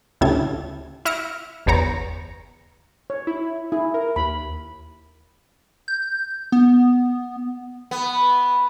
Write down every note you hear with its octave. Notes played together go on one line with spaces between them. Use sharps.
D2 A2 C#3 G3 A4 G#6
E4 E5 F6 A#6 C#7 D7
G1 E2 C5 C#5 A#5
C#5
E4
E4 G#4
A#4
D#2 B5
G6
B3
B3